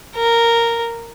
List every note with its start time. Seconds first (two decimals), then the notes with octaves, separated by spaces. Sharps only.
0.16 A#4